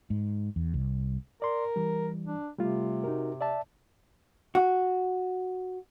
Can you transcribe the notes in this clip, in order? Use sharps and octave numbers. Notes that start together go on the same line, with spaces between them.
G#2
E2
C2
A#4 D5 C6
E3 G3
D4
C3 G3 A3 F4
D#4 F#4 A#4
D5 E5 A5
F#4